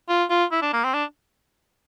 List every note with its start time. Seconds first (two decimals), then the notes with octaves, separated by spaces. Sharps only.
0.09 F4
0.30 F4
0.52 E4
0.62 D4
0.73 A#3
0.84 C4
0.94 D4